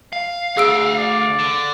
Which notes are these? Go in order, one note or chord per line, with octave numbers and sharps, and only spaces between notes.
F5
D2 G#4 E6 D7
D5
D3